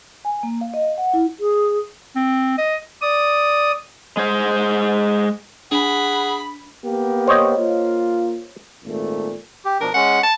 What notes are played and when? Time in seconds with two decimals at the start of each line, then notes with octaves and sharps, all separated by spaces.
0.25 G#5
0.43 A#3
0.61 F5
0.74 D#5
0.98 F#5
1.13 E4
1.40 G#4
2.16 C4
2.58 D#5
3.02 D5 D#6
4.17 G#3 G#4 C5
5.72 D4 G#4 F#5 B5
6.85 A#3 B3 G4
7.28 C5 C#5 D#5
7.58 A#3 F4
8.84 G#1 A#2 A3
9.65 G4
9.81 B2 F3 D4 A#4
9.94 G#3 C#4 F#5
10.23 A5